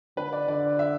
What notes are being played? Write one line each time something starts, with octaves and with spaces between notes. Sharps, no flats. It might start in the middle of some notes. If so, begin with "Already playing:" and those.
D3 B4
D5
D3 D5
E5